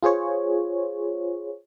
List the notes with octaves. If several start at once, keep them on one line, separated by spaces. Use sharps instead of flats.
F4 G#4 C5 C#5